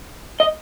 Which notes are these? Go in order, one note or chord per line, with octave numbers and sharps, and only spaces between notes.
D#5